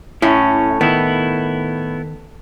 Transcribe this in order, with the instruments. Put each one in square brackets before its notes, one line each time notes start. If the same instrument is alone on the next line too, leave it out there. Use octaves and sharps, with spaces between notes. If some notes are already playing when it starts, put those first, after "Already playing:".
[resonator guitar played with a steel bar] A2 [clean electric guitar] C#4 [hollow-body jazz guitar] E4
[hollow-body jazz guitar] D#3 [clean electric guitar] B3 E4